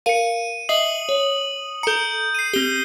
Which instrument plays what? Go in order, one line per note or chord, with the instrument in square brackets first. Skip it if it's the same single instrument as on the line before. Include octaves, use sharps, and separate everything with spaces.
[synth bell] A#4 F5 [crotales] C#7 D#7
[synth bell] D#5 E5 C7 [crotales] D#6 F#7
[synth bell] C#5
[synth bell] A4 A#5 [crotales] G6 C#7
[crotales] C7 D#7
[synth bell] C4 G4 [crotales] G7